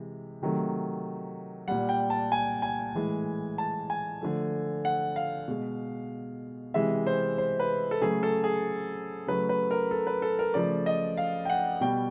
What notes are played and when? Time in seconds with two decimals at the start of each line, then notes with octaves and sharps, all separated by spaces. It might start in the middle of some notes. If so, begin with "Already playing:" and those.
Already playing: C3 E3 G#3
0.42 C3 D#3 F#3 A3
1.68 A#2 G3 F#5
1.89 G5
2.10 A5
2.32 G#5
2.62 G#5
2.94 A2 E3 G#3
3.58 A5
3.90 G#5
4.21 D3 F3 A3
4.85 F#5
5.16 F5
5.48 B2 G#3
6.74 C3 E3 G#3 E5
7.07 C5
7.38 C5
7.60 B4
7.91 A4
8.01 C#3 F#3 A3 G#4
8.23 A4
8.44 G#4
9.27 C#3 F#3 A3 B4
9.49 B4
9.71 A#4
9.91 A4
10.07 B4
10.22 A4
10.39 A#4
10.54 C#3 F3 A3 D5
10.86 D#5
11.17 F5
11.45 G5
11.50 F#5
11.81 B2 G3 G5